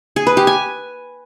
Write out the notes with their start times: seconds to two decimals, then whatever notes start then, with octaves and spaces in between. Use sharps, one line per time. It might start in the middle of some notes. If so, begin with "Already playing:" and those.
0.16 G#4
0.27 B4
0.37 G4
0.47 G#5